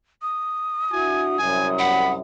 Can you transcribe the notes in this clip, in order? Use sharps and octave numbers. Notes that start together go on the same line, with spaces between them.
D#6
D4 E4 F#4 G#5
C2 F#2 G#5
F#5 B5